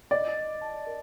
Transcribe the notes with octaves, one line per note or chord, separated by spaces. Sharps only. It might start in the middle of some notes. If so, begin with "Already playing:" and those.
D5 D#5
D#5
A5
A#4